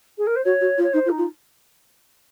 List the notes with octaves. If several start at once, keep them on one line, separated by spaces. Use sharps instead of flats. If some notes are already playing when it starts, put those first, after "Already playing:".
G#4
A#4
C5
F#4 C#5
F#4
F4
C#5
D#4 C5
F4
D#4
F4